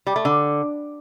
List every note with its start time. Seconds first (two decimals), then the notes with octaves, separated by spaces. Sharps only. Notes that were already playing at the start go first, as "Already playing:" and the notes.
0.07 G3
0.16 A3
0.25 D3